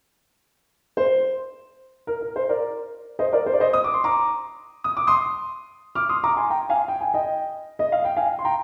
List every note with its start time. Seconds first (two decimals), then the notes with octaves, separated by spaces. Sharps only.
0.97 C5
2.07 A#4
2.21 A#4
2.36 C5
2.49 A#4 D5
3.19 C5 D#5
3.33 A#4 D5
3.46 C5
3.54 D5
3.60 C5 D#5
3.73 D#6
3.84 D6
3.94 C6
4.04 A#5 D6
4.84 D#6
4.97 D6
5.07 C6 D#6
5.95 D6 F6
6.09 C6 D#6
6.24 A#5 D6
6.37 G#5 C6
6.50 G5 A#5
6.69 F5 G#5
6.88 G5
7.01 G#5
7.14 D#5 G5
7.79 D#5
7.92 F5
8.05 G5
8.17 F5 G#5
8.39 C6
8.45 G5 A#5